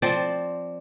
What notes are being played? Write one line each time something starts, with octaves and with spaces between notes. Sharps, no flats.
F3 C4 D5